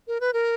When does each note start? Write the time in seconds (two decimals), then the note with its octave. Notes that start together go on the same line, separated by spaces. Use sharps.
0.08 A#4
0.20 B4
0.33 A#4